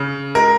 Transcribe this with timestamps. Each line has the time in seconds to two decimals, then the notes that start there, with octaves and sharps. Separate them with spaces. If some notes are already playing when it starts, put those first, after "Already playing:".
Already playing: C#3
0.35 G#3 A#4